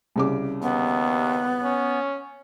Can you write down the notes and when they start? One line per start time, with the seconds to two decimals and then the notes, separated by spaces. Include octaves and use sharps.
0.16 C2 C#3 D6
0.62 D#2 B3
1.63 C#4